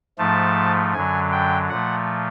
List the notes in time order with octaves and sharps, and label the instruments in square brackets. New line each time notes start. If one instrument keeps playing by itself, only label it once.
[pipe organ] G#2 F3 A3 A5
F#2 D3 F#3 G#5
G5
A#2 F3 A3 F#5